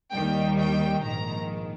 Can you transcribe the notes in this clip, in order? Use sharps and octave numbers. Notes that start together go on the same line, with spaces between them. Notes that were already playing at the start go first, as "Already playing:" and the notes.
D#2 D#3 G3 G5
G5
A#1 G#2 D#3 A#5